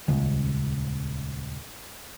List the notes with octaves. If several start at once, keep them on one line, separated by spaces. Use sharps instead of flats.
D#1 C#2